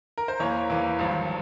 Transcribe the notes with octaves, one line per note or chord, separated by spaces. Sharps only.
A#4
C5
E2 E3 A#3 C#5
E2 E3 A#3
G#1 G2 F3